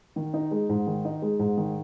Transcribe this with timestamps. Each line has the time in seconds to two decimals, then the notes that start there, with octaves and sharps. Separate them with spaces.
0.16 D#3
0.34 D#4
0.51 G#3
0.69 G#2
0.87 D#3
1.05 D#4
1.22 G#3
1.39 G#2
1.57 D#3